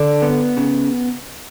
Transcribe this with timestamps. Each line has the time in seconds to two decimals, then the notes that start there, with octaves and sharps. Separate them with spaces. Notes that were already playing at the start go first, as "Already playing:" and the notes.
Already playing: D3 D4
0.22 B3
0.57 C#3